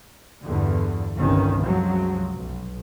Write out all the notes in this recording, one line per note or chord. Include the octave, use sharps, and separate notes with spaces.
E2 G2 D3
G1 C2 D#3 C#4
C2 F#2 F3 F#3 G#3
B1